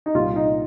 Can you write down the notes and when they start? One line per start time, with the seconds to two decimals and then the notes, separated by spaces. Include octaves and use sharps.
0.06 D#4
0.14 C2 A#2 G3 F4
0.36 D#4